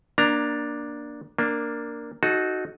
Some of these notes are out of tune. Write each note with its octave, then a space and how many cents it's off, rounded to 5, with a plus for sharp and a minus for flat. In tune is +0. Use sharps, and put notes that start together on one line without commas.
A#3 +20 D4 +0 A#5 +0
A#3 +0 D4 +0
D#4 +0 F#4 +0 A4 -30